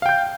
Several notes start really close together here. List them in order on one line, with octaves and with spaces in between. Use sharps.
F5 G5 G6